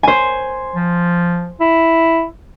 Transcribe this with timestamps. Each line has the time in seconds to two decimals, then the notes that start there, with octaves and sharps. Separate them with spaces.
0.03 C5 G#5
0.75 F3
1.60 E4